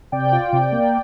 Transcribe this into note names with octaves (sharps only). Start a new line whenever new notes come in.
C3 D5 G5
F4
C3
A#3